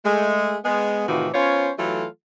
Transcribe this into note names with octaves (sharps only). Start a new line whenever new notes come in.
G#3 A3
G#3 B3
A2 C3 D#3 E3 F4 F#4
B3 C#4 F4 C5 C#5
E3 F#3 A3 F4 A4